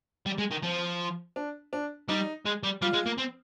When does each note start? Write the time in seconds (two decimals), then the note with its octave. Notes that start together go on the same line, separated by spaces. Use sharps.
0.26 G3
0.38 G#3
0.51 D#3
0.63 F3 C4
1.36 D4
1.73 D4
2.08 G3 D#4
2.45 G#3
2.63 G3
2.82 G3 F4
2.94 G#3
3.06 A#3
3.18 C4